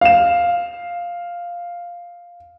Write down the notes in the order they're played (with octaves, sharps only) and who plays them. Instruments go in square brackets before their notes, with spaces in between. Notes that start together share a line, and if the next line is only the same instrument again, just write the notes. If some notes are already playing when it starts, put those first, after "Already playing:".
[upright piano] F5 E7